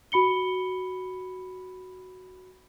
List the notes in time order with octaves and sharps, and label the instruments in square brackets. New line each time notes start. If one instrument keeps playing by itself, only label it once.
[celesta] F#4 B5 C#7 G7